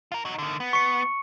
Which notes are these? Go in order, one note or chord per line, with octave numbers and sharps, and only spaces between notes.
F4 A#4
D#4 F#4
D3 D#3
B3
C#6 C#7